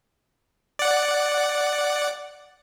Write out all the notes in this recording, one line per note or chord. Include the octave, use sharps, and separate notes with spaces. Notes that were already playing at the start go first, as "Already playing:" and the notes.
D5 F#5